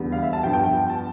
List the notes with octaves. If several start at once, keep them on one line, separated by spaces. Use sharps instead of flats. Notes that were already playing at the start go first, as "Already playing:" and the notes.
Already playing: E2 D3 G3 B3
F5
E5
A5
G2 F3 B3 G5
G5
G5
G5
A5